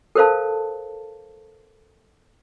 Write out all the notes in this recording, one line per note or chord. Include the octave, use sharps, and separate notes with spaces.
A4 A#4 C5 F5 A5